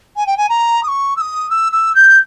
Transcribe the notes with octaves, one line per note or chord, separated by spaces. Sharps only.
G#5
G5
G#5
A#5
D#6
C#6
E6
D#6
E6
E6
G6